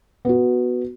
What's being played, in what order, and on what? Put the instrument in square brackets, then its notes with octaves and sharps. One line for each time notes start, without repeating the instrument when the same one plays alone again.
[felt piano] B3 F#4